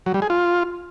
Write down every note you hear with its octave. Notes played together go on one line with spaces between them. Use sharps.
F#3
G3
G#4
F4